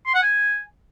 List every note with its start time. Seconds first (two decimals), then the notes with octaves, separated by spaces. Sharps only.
0.07 C6
0.15 F#5
0.23 G#5